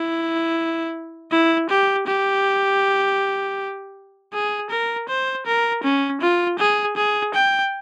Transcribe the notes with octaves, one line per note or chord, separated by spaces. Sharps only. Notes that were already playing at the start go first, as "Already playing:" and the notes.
Already playing: E4
E4
G4
G4
G#4
A#4
C5
A#4
C#4
F4
G#4
G#4
G5